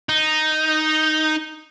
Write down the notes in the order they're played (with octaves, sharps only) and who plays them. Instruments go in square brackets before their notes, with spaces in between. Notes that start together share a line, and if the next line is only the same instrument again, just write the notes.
[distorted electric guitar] D#4